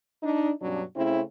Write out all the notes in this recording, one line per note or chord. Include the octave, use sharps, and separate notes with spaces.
D4 D#4
G2 B2 F#3 C#4 D4
C#3 A3 C4 C#4 E4